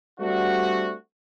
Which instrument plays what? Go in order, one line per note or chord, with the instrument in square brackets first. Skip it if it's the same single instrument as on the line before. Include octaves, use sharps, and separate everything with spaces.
[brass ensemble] G3 A3 C4 D4 F#4